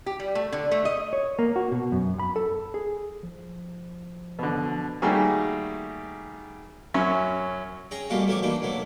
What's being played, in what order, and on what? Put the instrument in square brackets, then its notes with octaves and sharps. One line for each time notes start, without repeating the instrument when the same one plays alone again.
[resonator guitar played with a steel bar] G4
G3
A3
D3
A3
D#5
[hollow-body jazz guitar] C#5
A#3
F#4
B2
F#2
B5
A4
G#4
[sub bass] F3
[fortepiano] B2 D3
D#3 G3 A3 A#3 F#4 G#4
F#2 F#3 C#4 E5
[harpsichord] C#4 G#4 G5 A#5
B2 G3 A3 A#3 F4 F#4
E3 F#3 A3 G4 C#6 D6
E3 A#3 D4 D#4 A4
B1 F#3 A3 A#3